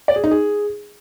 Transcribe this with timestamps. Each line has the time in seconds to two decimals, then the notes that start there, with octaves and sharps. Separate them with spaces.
0.08 D5
0.16 G#4
0.24 D#4
0.31 G#4